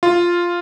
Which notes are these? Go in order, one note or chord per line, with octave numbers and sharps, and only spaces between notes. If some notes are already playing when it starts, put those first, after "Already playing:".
F4